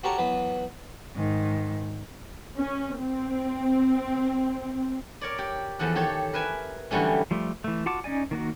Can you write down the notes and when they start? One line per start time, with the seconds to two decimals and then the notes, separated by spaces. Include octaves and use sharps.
0.03 F#4 G4 A4 A#4 C#5 A#5
0.18 E3 F#3 B3
1.15 G#2 D#3
2.58 C#4
3.01 C4
5.21 A#4 C#5 D5
5.38 G4
5.79 E2 F3 A4 F#5
5.95 D#3 G4 A4 C#5
6.33 A#4 B4 E5 G#5
6.91 D3 E3 F#3 G3 A3 C#4
7.31 F3 G3 A3
7.64 E3 A3
7.86 F4 F#4 F#5 A5 D6
8.04 C#4 D#4 D5 G#5
8.31 D#3 A#3 F#4